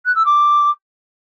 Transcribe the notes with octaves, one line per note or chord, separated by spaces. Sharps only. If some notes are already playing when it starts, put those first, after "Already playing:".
F#6
E6
D6